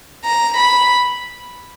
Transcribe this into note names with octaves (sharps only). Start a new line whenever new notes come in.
A#5
B5